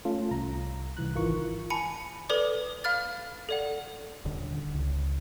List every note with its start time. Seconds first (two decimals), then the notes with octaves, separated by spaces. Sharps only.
0.05 A3 C#4 F4 A4
0.31 C2 A#5
0.97 C2 E3 F#6
1.15 G#1 D#3 E3 F4 A#4 C#6
1.70 G#5 A5 B5 C#7
2.29 A4 B4 D5 D6
2.84 F5 B5 F6 A6
3.49 A4 D5 F#5
4.25 D#1 D3
4.74 C#2